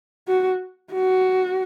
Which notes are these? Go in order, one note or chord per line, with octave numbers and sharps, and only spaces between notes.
F#4
F#4